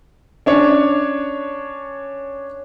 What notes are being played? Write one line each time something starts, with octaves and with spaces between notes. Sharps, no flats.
C#4 D4 C#5